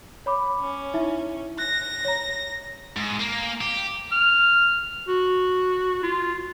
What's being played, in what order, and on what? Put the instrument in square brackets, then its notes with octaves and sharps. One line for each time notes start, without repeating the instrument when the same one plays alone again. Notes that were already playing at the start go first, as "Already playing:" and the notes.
[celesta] C#5 B5 D6
[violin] C#4
[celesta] D#4 E4 E5
[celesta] F#6 [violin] A#6
[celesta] C#5 A#5
[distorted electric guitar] G#2
A#3
G4
[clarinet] F6
F#4
F4